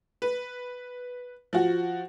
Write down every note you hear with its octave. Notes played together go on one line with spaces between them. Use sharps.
B4
F3 F#4